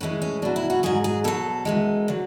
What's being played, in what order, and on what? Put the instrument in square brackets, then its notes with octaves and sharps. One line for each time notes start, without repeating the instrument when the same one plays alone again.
[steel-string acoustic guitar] A2 E3 G#3 C#4
C#4
B2 F#3 D4
E4
F#4
G#2 F#3 G#4
G#4
B2 F#3 A4
F#2 E3 G#3
D3 F#3